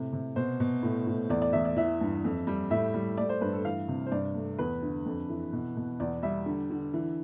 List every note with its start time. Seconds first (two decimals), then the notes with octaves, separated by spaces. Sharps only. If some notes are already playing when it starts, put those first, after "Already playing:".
Already playing: A2 C3
0.13 C3
0.36 B2 C5
0.60 B2
0.83 A2
1.07 A2
1.30 E2 D5
1.42 D5
1.53 E2 E5
1.65 D5
1.76 E3 E5
2.01 G2
2.24 F2
2.47 G3
2.70 A2 E5
2.94 G3
3.17 A3 D5
3.29 C5
3.41 G2 B4
3.53 A4
3.65 E3 F5
3.88 C3
4.06 C5
4.12 G2 D5
4.35 A3
4.59 E2 B4
4.83 D3
5.06 F2
5.29 E3
5.53 B2
5.77 B2
6.00 E2 D5
6.23 G3 E5
6.46 D3
6.70 D3
6.94 E3